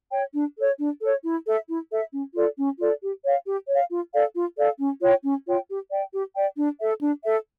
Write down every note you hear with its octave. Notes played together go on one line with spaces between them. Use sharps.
C#5 G5
D4
A4 C#5
D4
A4 C#5
E4
A4 E5
E4
A4 E5
C#4
F4 A4 D5
C#4
F4 A4 D5
G4
C#5 F5
G4
C#5
F5
F4
A4 D5 F5
F4
A4 D5 F5
C#4
F4 C#5 G5
C#4
F4 C#5 G5
G4
D5 G5
G4
D5 G5
D4
A4 E5
D4
A4 E5